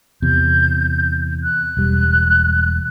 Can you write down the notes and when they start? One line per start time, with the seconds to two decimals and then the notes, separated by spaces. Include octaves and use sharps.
0.22 E2 C3 G6
1.43 F#6
1.77 E1 G3